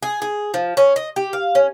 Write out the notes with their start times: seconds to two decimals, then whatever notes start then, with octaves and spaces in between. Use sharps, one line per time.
0.03 G#4
0.22 G#4
0.54 F3
0.77 C#4
0.96 D#5
1.16 G4
1.33 F5
1.55 C#4